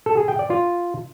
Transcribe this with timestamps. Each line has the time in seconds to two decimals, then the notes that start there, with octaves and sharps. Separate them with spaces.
0.06 A4
0.17 G#4
0.28 G5
0.39 D5
0.50 F4